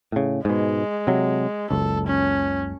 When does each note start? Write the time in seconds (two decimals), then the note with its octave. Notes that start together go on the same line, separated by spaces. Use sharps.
0.12 A2 C#3
0.45 G#2 B2 G#3
1.07 C3 F#3
1.71 F#1 C#2 A4
2.07 C#4